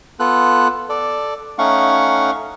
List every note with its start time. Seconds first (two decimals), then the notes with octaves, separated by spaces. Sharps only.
0.20 B3 F4 A4 F#6
0.89 A4 D5
1.58 A3 C#4 D#4 F5 F#5 C#6